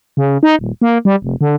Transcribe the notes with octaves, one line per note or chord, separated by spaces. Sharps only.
C#3
D#4
D#1
A#3
G3
F1
D3